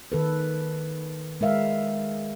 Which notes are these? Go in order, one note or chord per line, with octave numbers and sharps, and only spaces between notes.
D#3 A4 B4
G#3 A#4 E5 F5